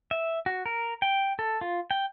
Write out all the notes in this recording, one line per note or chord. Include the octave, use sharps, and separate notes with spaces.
E5
F#4
A#4
G5
A4
F4
G5